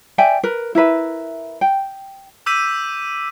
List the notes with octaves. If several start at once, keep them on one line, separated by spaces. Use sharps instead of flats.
D5 E5 G5 G#5
A#4 B4
E4 A#4 B4 E5
G5
D6 E6 G6 B6 D#7